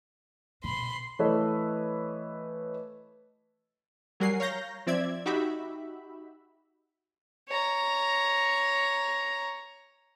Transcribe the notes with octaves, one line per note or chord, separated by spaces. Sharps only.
B2 B5 C6
E3 A3 A4 B4 C#5 D#5
F#3 G3 A#4 F#5 G#5 C7
C#5 F5 A#5 G6 A#6
F3 C4 D5 E5 G#6
D#4 F#4 G4 E5 B5
C#5 A#5